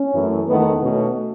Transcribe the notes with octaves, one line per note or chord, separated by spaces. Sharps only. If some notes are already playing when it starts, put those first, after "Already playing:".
Already playing: C#4
F#2 E3 A3
E2 D#3 A3 B3
B2 A3 C#4